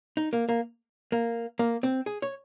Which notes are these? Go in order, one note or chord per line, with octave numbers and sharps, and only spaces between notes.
D#4
A#3
A#3
A#3
A#3
C4
G#4
C#5